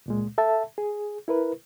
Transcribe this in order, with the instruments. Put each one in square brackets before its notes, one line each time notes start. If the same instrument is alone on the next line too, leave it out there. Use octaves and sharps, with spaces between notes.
[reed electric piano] C#2 A#2 G#3
A4 E5 A5
G#4
E4 A#4 B4